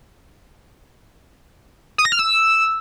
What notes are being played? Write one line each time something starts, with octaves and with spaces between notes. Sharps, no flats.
D#6
A#6
F6
E6